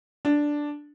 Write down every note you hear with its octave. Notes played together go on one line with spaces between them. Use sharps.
D4